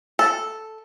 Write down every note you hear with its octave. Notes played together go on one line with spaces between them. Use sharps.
A4